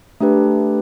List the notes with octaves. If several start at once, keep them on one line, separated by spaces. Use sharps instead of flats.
A3 D4 G4 B4